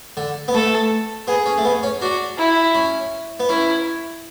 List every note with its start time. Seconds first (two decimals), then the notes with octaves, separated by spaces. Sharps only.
0.17 D3
0.48 B3
0.54 A3 A4
1.27 B3 G#4
1.46 C#4
1.58 A3
1.65 B3
1.83 C#4
2.02 D4 F#4
2.39 E4
2.75 C#4
3.40 B3
3.49 C#4 E4